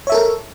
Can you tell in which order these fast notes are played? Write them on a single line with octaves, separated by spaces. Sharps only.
C#5 E5 A4 A#4